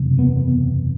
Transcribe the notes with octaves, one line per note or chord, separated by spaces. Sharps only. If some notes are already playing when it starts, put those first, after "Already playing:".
Already playing: F#1 E2 C3
B3